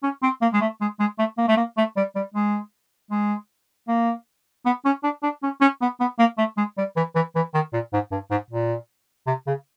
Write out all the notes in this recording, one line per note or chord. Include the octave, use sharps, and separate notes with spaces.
C#4
C4
A#3
G#3
A3
G#3
G#3
A3
A#3
A3
A#3
A3
G3
G3
G#3
G#3
A#3
B3
C#4
D4
D4
C#4
C#4
B3
B3
A#3
A3
G#3
G3
E3
E3
E3
D#3
A#2
G#2
G2
G#2
A#2
C3
C#3